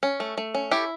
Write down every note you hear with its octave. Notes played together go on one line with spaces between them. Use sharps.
C#4
A3
A3
C#4
E4 G4 A4